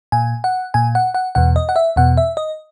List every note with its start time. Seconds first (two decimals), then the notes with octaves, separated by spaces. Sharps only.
0.12 A#2 G#5
0.44 F#5
0.74 A#2 G#5
0.95 F#5
1.14 F#5
1.35 E2 B2 F#5
1.56 D#5
1.69 F#5
1.76 E5
1.96 E2 B2 F#5
2.17 E5
2.37 D#5